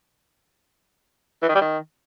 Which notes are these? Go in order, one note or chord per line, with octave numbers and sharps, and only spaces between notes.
E3
D#3
G3
D#3